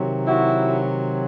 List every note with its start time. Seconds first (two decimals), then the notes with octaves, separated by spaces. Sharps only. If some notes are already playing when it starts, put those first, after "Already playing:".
Already playing: C3 D#3 F#3
0.26 E4 F#4